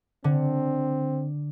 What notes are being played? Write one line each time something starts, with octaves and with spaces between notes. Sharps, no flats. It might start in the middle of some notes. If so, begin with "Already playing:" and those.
D3 C4